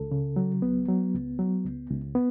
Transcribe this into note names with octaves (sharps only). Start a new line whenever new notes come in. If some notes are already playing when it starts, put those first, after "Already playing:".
Already playing: C#2 A4
C#3
F#3
C#2 B3
F#3
C#2
F#3
C#2
C#2
B3